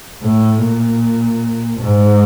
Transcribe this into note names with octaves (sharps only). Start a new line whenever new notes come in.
A2
A#2
G#2